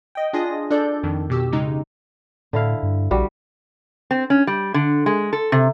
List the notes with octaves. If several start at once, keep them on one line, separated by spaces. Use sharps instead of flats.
D#5 G5
D4 F4 G#4 D#5 D#6 A#6
D4 A4 D5 G6
F2 D#3
B2 G4 E6
C#3 G#3 D#4
A2 D3 E4 F5
G2
A#1 G3 F#4
C4
C#4
G3
D3
G#3
A4
C3